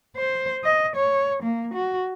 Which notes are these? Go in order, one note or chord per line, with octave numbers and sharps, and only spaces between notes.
C5
D#5
C#5
A#3
F#4